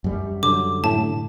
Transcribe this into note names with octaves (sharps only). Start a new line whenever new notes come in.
F#2 G3
D3 F#3 D6
A2 A5